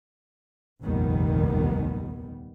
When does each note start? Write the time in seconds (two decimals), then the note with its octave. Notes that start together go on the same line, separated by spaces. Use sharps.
0.82 F1 A#1 D#2 D#3 G3 B3